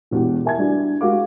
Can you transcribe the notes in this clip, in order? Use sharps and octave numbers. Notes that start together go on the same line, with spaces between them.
E1 E2 B2 G4
A#4 E5 G#5 A5 G#6
G3 D4 E4 F#4 D5
G#3 F#4 G4 A#4 F5 D6